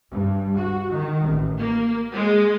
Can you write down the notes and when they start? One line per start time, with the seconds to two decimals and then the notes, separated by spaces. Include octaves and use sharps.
0.11 G2
0.57 F#4
0.91 D#3
1.27 A1
1.59 A#3
2.15 G#3